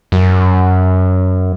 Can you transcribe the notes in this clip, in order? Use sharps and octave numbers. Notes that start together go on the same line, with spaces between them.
F#2